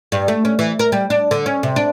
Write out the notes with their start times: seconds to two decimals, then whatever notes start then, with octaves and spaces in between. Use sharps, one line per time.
0.12 G2
0.28 A3
0.45 C#4
0.59 E3
0.79 A#4
0.92 G3
1.10 D4
1.31 D3
1.46 C#4
1.63 C3
1.76 D4